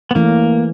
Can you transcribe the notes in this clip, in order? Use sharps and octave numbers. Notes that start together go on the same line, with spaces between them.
B3
E3 A3 A#3 C#4